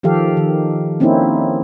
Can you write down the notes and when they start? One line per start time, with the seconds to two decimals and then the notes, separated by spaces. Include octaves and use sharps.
0.03 D#3 F3 G4 A4 F5
0.37 D#3
1.00 A#3 C4 C#4 D#4 E4